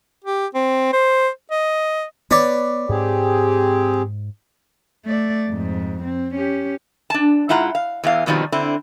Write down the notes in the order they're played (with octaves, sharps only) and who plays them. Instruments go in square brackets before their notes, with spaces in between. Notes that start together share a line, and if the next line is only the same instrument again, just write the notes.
[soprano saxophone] G4
C4
C5
D#5
[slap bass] B3 [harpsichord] B4 C#5 D5
[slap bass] G#2 [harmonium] C4 G4 G#4
[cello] A3 D5
F2 G#2
C4
C#4 G4
[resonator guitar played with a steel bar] D4 A5
G#2 E4 F4 F#5 A#5
F5
E2 E3 F5
F2 B2 D#3 F3 G3
D3 C4 E4